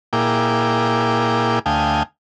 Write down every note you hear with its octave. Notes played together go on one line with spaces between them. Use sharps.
A#2 A#3 E4 G#4 G5 D6
D2 A3 F5 G5 G#5 D#6